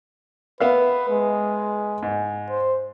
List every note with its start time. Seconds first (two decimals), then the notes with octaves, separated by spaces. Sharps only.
0.60 B3 B4 E5 F5
1.09 G#3
2.03 G#2
2.50 C5